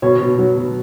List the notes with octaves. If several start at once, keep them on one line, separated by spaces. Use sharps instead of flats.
B2 C#5
B2
F#3
B2